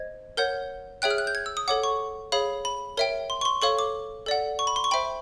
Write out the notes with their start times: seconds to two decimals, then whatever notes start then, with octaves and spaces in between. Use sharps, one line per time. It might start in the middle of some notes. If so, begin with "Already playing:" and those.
Already playing: C5 D#5 G#6
0.37 A#4 C#5 F#5 G6
1.02 G#4 C#5 E5 G5 F#6
1.10 F6
1.18 F#6
1.27 G6
1.35 G#6
1.46 E6
1.57 D#6
1.68 A4 C#5 F#5 D6
1.83 C#6
2.32 G#4 C#5 F5 B5
2.65 B5
2.97 A#4 C#5 E5 G5
3.30 C6
3.41 C#6
3.45 C6
3.62 A4 C#5 F5 C#6
3.79 D6
4.26 A4 D5 F#5
4.59 C#6
4.67 B5
4.76 C6
4.84 C#6
4.91 C5 E5 G5 B5